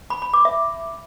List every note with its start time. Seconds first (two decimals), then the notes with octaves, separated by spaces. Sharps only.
0.10 B5
0.22 B5
0.34 D6
0.45 E5